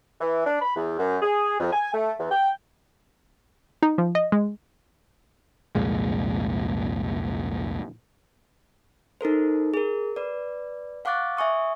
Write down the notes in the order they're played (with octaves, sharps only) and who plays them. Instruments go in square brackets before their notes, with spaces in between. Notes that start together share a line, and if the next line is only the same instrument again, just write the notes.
[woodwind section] E3
D4
B5
E2
F#2
G#4
F2
G#5
A3
E2
G5
[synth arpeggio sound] D#4
F3
D#5
G#3
[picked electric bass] C2 F2 A#2 G#3
[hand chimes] D#4 A4 A#4 C5
G#4 A#4
B4 D5
F5 F#5 C#6 D6 F#6 A6
E5 G#5 C#6 D#6